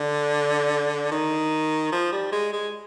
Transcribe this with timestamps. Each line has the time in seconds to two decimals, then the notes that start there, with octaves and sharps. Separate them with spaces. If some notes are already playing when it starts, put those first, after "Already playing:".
Already playing: D3
1.11 D#3
1.92 F3
2.12 G3
2.33 G#3
2.53 G#3